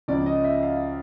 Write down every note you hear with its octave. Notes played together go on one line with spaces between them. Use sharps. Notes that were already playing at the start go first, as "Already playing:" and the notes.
C#2 C#3 F3 D5
D#5
E5
F5